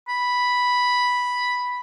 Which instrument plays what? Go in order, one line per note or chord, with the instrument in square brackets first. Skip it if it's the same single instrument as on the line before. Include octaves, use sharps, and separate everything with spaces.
[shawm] B5